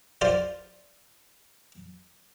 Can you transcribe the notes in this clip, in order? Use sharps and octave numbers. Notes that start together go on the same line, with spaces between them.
F4 C5 D5